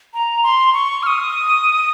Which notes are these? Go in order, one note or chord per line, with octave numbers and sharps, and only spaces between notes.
A#5
C6
C#6
F6
D#6